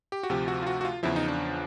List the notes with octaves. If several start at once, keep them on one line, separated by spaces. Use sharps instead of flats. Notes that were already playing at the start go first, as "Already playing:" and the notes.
G4
F#4
D2 C3 F3 G4
F#4
F4
F#4
F#4
F4
E2 C#3 F3 E4
D#4
D4